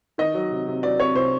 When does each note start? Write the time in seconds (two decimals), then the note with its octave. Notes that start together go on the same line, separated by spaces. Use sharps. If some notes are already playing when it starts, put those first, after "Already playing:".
0.18 D#3 D#5
0.34 F#3
0.51 C3
0.67 C3
0.83 F#3 D5
1.00 C3 C#5
1.15 C3 C5